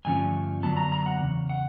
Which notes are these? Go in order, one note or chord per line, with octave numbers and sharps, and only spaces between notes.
G2 D3 F3 A3 C#4 G#5
F#2 D3 F#3 B3 A5
A#5
A#5
F#5
E2 C#3
F#5